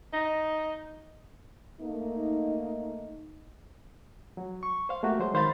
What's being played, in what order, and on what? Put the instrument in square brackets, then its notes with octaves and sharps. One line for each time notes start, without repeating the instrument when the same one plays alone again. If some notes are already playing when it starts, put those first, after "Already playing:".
[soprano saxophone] D#4
[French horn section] A3 A#3 D#4
[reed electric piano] F#3
C#6
C5 F5
A3 A#3 F#4 G4
F#3 G#3 C5
D#3 C5 F5 B5 A6